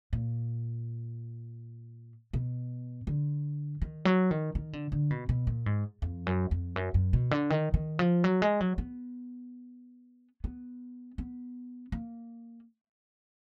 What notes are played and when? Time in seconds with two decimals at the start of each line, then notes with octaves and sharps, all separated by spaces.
0.13 A#2
2.33 B2
3.07 D3
3.82 D#3
4.05 F#3
4.31 D#3
4.55 D#3
4.73 D3
4.92 D3
5.10 B2
5.29 B2
5.47 A#2
5.66 G#2
6.02 F2
6.27 F#2
6.51 F2
6.76 F#2
6.94 F#2
7.13 B2
7.31 D3
7.50 D#3
7.74 D#3
7.99 F3
8.24 F#3
8.42 G#3
8.61 F#3
8.78 B3
10.44 B3
11.18 B3
11.92 A#3